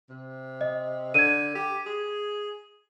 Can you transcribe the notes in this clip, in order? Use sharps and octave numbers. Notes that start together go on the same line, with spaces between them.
C3
D#5
D3 G#6 D#7
G4
G#4